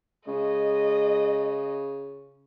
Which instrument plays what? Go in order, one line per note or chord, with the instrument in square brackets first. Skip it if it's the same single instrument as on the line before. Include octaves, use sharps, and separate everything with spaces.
[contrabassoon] C#3 [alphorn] G#3 [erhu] D#5